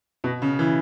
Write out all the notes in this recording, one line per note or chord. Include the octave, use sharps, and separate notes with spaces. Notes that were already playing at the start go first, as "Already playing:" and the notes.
B2
C#3
E3